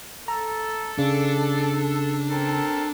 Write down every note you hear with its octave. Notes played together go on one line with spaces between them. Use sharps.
A4 A#5
C#3 D4
C4 A4 A#4